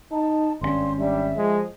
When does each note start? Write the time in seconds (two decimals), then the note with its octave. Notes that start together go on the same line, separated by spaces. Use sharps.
0.12 D#4 A5
0.61 G#1 G2 D3 C#4 C6
0.99 G3 D4 E5
1.37 F3 G#3